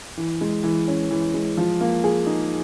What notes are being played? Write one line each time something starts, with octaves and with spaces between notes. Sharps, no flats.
E3
G#3
E3
C#4
E3
G#3
F3
A#3
G#4
D#4